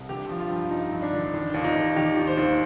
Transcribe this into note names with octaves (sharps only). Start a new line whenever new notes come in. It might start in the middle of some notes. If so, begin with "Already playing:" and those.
Already playing: C2
D3 G4
F3
F4
G2
G2 D#4
G2
D4
D3
D#3 D4
D#2
D#4
D#2
D#3 G4
D#3
C5
D#2